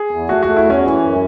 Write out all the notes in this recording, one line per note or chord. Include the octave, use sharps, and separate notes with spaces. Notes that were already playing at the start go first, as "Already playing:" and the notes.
Already playing: G#4
E2
A3 F#4
A3 F#4
E4
E2 C#4
E3
F#2